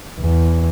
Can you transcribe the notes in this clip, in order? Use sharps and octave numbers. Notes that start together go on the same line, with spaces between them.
E2